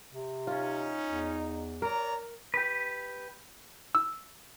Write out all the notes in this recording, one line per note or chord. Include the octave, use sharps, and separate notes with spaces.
C3
C#4 D#4 F4
E2
A#4 C#5 D5 A#5
G4 B4
E6